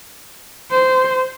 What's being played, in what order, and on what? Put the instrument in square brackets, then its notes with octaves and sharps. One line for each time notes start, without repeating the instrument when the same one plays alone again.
[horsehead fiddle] C5